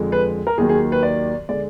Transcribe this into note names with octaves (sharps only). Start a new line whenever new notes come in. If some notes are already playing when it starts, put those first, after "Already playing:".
Already playing: F2 D3 G#3
B4
A#4
D#2 D#3 F#3 G#4
G#4
B4
D5
D3 G#3 D5